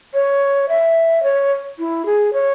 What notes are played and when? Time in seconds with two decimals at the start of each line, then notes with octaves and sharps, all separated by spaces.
0.14 C#5
0.69 E5
1.23 C#5
1.79 E4
2.06 G#4
2.33 C#5